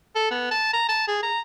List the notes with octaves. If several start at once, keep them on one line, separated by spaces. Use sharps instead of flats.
A4
B3
A5
A#5
A5
G#4
A#5